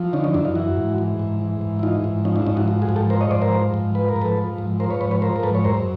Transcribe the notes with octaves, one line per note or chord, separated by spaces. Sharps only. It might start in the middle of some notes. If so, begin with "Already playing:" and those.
Already playing: F3
D3 C#4 D#4
C#4 D#4
F#2 D4 E4
D#4 F4
E3 E4 F#4
G#2
E3
G#2
E3
G#2
E4
E3 D#4 F4
G#2
F3 C#4 D#4
D4 E4
G#2 C#4 D#4
E4 F#4
F3
F#4 G#4
G#2
G4 A4
F3 A#4 C5
C#5 D#5
G#2 C5 D5
A#4 C5
F3
G#2
F3 B4
A#4
G#2
A4 B4
F3
G#2
F3 A#4 C5
B4 C#5
G#2 B4 C#5
B4 C#5
F3 A#4 C5
A#4
G#2 A4 B4
C#5
F#2 A#4 C5